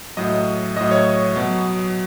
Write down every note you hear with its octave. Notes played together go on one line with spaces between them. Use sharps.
A2 F#3 D#5 D#6
A2 F#3 D#5 D#6
C#5 C#6
B2 F#3